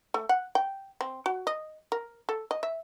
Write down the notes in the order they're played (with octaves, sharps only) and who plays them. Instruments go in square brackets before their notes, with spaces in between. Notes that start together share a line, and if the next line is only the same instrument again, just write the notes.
[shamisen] A3
F#5
G5
C4
F#4
D#5
A#4
A4
D#5
E5